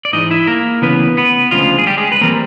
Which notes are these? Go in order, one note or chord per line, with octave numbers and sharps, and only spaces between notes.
D5
G#2 E3 G#3 D#4 D#5
E4 E5
A#3 A#4
D2 C#3 E3 B3 B4
B3 B4
D2 C#3 F3 G#3 F4
G#4
G3 G4
G#3 G#4
B4
E3 G3 A#3 C4 A#4